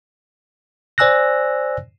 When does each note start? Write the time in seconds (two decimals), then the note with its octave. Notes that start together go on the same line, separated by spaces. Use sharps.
0.98 C5 D5 G#5 E6 F#6 A#6